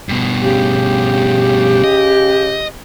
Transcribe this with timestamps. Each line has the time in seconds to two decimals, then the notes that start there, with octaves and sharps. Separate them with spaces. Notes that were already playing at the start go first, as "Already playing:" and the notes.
0.09 G2 B2
0.43 C#3 G4
1.84 D#5